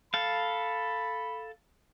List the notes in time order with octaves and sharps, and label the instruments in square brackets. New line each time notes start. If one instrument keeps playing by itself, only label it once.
[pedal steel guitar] A4 F5 [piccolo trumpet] B5